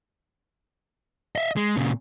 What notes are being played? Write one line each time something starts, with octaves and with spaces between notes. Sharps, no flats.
D#5 E5
G#3
A#2 C#3